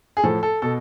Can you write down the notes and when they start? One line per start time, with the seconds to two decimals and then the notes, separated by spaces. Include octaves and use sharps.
0.17 G#4
0.23 A2 F3 A4
0.43 A4
0.62 B2 A4